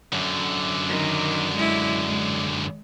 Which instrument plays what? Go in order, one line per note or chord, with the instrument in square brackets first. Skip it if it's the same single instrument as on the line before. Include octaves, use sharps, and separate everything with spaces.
[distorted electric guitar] F#2 D3
[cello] D#3
G#3 E4
G#3